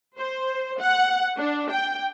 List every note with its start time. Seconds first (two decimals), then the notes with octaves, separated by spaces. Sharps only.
0.18 C5
0.81 F#5
1.40 D4
1.72 G5